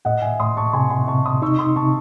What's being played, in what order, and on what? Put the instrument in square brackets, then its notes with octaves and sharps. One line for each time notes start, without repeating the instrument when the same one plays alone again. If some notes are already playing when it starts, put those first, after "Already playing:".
[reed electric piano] A2 [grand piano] D#5 F#5
[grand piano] E5 G#5
[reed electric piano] A2 [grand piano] C6 D#6
[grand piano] A5 C#6
[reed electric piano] C3 [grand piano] G#5 C6
[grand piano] G#5 C6
[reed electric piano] C3 [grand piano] A5 C#6
[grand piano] C6 D#6
[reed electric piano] D#4 [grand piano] C#6 E6
[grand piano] C6 D#6
[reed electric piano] C3 [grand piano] A5 C#6